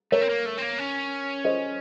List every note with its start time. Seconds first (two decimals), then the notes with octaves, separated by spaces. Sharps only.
0.12 A3 A#4 C#5
0.21 C4
0.29 A#3
0.46 A3
0.58 C4
0.62 A#3
0.79 C#4
1.44 C5 D#5